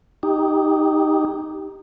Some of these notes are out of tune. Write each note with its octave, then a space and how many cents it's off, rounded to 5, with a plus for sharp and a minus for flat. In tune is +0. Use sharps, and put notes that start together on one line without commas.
D#4 +0 G4 +0